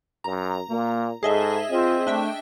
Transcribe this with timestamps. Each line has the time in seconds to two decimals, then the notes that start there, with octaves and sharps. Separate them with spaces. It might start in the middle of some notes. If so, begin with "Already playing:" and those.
0.24 F#2 A#5
0.70 A#2 A#3
1.23 G#2 G#4 A4 D#5 E5
1.70 C4 F4
2.07 A3 D4 E5 G5